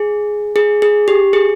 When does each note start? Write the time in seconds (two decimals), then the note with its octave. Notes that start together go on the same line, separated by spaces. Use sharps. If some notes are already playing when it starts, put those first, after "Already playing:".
Already playing: G#4
0.56 G#4
0.82 G#4
1.08 G4
1.33 G#4